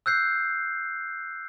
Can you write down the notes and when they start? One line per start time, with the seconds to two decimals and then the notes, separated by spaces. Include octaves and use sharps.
0.06 E6 F#6 G6 C7